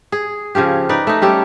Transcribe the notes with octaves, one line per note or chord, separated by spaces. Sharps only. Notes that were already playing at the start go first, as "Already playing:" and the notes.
G#4
C#3 F3 C#4 G4
D#4 B4 D5
A3 D#4
G3 C#4 G4 A4